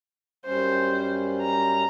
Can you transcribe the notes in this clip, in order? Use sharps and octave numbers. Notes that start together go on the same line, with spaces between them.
F#2 G3 C#4 C5
A#5